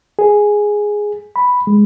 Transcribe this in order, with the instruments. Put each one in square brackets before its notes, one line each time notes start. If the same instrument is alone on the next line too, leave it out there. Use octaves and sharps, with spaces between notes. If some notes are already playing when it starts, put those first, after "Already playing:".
[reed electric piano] G#4
B5
G#3